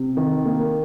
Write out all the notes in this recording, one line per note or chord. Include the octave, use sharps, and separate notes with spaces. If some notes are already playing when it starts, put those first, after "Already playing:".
Already playing: C3
D#3
A#3